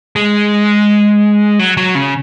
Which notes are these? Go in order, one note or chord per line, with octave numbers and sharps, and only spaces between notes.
G#3
F#3
F#3
C#3